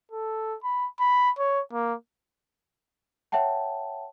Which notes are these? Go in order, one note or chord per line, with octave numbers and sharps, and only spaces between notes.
A4
B5
B5
C#5
A#3
C#5 E5 F#5 G5 A5